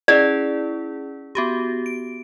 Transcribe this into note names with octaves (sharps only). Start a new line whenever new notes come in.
C#4 E4 G#4 D5
B3 F#4 G4
D7